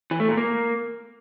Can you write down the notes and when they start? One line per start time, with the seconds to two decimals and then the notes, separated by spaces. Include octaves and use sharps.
0.11 E3
0.20 A3
0.29 A#2
0.37 A#3